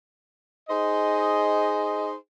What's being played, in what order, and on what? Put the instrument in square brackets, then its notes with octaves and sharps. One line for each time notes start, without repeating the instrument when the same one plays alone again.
[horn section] D#4 G#4 C5 D#5